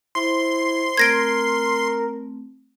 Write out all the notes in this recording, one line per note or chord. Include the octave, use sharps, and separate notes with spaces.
E4 C5 C6
A3 C4 A#4 G#6 A#6 D7